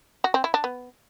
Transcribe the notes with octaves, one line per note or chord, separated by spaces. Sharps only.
F#4
C4
E4
D4
B3